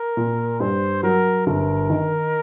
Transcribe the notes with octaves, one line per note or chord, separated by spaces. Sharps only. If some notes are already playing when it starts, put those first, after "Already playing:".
Already playing: A#4
A#2
G2 C5
F#3 A#4
G1 A#4
D#3